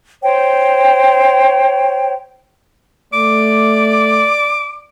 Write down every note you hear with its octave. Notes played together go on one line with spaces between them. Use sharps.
C5 C#5 G5
A3 D5 D6